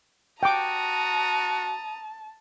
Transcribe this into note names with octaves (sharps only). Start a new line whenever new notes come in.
F#4 G5 A5 A#5 D6 D#6